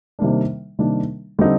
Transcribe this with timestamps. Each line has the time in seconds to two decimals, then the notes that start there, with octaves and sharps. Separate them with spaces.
0.19 C3 D#3 G3 A#3 D4
0.79 C3 D#3 G3 A#3 D4
1.39 D3 G3 C4 D#4 A4